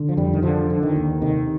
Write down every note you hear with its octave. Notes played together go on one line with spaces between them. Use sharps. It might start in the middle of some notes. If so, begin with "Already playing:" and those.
Already playing: D3
F3
F2 G3
D#3
D3 F3
D3
D#3
D#2
C3 D#3